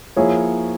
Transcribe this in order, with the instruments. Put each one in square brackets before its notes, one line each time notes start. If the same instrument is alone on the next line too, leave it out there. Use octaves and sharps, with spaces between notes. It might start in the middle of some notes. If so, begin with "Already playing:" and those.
[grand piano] F3 A#3 E4 G#4 C#5